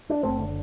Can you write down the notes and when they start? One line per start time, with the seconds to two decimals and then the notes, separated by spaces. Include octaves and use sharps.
0.09 D4
0.23 F#1 A3 C4
0.39 D3